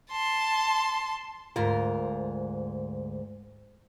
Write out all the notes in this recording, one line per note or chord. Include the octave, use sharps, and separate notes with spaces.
A5 C6
D2 G#2 F4 A#4